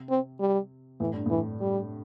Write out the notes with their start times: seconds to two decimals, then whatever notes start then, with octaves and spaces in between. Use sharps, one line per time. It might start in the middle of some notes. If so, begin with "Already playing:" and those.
Already playing: C3
0.10 C4
0.40 G3
1.00 A2 E3
1.13 G2
1.26 A2 E3
1.61 G3